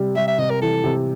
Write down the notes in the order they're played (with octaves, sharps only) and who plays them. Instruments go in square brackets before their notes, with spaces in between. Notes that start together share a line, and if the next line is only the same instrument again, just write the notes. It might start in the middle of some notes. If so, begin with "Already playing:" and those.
Already playing: [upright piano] C3 G3
[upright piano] G3 [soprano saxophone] E5
[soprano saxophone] E5
[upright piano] C3 [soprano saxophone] D#5
[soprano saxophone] A#4
[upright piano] E3 [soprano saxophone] A4
[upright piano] C3